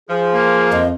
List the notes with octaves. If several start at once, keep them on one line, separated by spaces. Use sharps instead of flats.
F3 G#4
A#3
F2 D#5